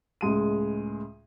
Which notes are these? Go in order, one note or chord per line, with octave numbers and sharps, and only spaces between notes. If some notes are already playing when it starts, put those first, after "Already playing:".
C#2 A2 G#3 D#7